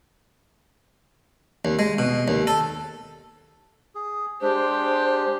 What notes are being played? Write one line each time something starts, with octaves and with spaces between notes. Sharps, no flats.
D#2
G#3
B2
D#2
A4
G#4
G#3 D4 G4 C5